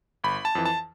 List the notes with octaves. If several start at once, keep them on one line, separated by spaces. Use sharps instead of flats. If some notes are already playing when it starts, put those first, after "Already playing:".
G1 B5
A5
F2 E3
A5